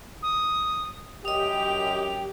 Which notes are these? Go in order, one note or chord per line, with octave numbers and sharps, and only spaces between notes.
D#6
F#2 G4 D#5 D#6 F7